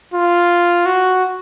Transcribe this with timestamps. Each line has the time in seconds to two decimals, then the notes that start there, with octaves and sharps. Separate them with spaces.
0.14 F4
0.86 F#4